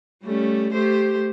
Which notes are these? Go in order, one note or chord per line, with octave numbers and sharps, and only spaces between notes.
G3 A3 C#4
A3 G4 C5